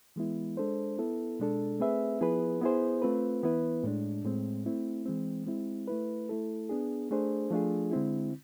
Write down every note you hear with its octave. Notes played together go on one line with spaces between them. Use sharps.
E3 G#3 B3 E4
G#3 D4 A4 C5
B3 E4 A4
B2 G#3 D4 A4
A3 C4 G#4 B4 E5
F3 B3 E4 G#4 B4
B3 E4 G#4 C5
A3 C4 F4 B4
E3 B3 E4 B4
A2 G#3 D4
A2 G#3 C4
A3 C4 E4
E3 G#3 C4
G#3 C4 E4
A3 E4 B4
A3 E4 A4
B3 D4 G#4
A3 D4 G#4 C5
F3 A3 D4 F4 G#4
D3 G#3 C4 E4